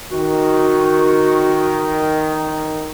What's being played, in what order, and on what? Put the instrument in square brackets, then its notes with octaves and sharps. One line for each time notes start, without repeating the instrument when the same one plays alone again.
[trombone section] D#3 [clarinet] F#4